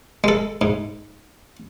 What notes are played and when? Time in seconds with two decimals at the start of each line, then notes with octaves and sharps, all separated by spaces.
0.24 G#3 A4
0.61 G#2